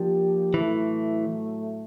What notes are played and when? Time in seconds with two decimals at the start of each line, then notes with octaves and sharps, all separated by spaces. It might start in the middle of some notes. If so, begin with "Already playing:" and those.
Already playing: F3 A#3 D4 G4
0.54 A2 E3 F#3 A3